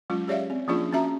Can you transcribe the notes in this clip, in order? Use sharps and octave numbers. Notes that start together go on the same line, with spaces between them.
F#3 G#3 C#4 F4
G4 G#4 C#5 D5 E5 F5
C4
F3 A#3 C#4 D4 F4 G#4
C#4 F#4 E5 A#5